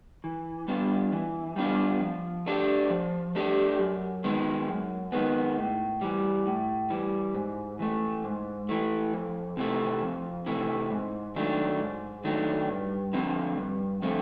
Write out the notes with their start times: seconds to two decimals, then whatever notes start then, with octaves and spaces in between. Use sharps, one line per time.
0.24 E3
0.68 G3 B3 D4 F4
1.12 E3
1.56 G3 B3 D4 F4
2.01 F3
2.46 A3 D4 G4
2.90 F3
3.35 A3 D4 G4
3.79 F#2
4.24 D#3 G#3 B3
4.68 F#2
5.12 D#3 G#3 B3
5.58 A2
6.01 E3 G3
6.46 A2
6.90 E3 G3
7.34 G#2
7.79 E3 A3
8.24 G#2
8.69 E3 A3
9.13 F2
9.57 C3 E3 A3
10.02 F2
10.46 C3 E3 A3
10.90 G#2
11.36 D#3 F#3 A3 D4
11.80 G#2
12.24 D#3 F#3 A3 D4
12.69 G2
13.13 D3 F3 A3 C4
13.57 G2
14.02 D3 F3 A3 C4